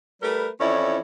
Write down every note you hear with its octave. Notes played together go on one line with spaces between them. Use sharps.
G3 A3 A#4 B4
F2 E3 C#4 E4 C#5 D5